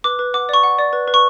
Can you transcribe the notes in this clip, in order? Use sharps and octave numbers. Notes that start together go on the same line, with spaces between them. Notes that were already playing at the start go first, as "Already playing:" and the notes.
B4 D6
B4
F#5 D6
D5 C#6
F#5
D5
B4
B4
C#6